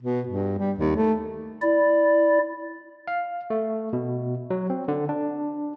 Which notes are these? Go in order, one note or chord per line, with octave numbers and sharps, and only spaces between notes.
B2
G2
G3
D#2
A3
E4 D5
F5
A3
B2
F#3
C4
D3
D4